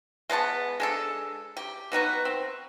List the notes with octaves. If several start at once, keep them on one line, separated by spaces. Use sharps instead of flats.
G#3 B3 D5 A5
G#3 D4 A4
G4
B2 D#4 F#4 B4
C4